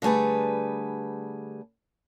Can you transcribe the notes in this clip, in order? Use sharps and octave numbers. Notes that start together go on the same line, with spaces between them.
D3 G3 A3 G#4 B4